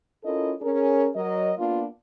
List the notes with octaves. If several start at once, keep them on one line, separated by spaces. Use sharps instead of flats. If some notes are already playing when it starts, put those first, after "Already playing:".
C#4 E4 F4 A4 A#4 D#5
C#4 G#4 A#4
F#3 A#4 D#5
A#3 B3 D4 F4